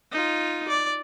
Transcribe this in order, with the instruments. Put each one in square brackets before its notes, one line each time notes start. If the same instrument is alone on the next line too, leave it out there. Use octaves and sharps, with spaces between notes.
[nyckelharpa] D#4 F4
D5